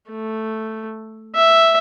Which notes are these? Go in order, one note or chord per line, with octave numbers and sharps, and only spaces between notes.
A3
E5